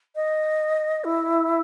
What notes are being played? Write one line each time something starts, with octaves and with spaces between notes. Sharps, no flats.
D#5
E4